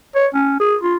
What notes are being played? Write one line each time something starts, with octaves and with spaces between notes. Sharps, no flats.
C#5
C#4
G#4
F4